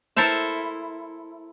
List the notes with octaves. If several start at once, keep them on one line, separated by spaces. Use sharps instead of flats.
E4 A4 A#4 C5 E5